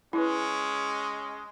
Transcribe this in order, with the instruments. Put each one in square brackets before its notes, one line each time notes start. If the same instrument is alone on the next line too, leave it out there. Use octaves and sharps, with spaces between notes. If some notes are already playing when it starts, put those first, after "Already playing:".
[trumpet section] G#3 C#4 [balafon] E4 B4